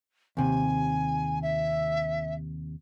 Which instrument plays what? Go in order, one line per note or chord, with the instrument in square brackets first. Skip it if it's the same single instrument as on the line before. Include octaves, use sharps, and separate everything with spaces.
[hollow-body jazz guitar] D#2 C3 [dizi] G#5
[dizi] E5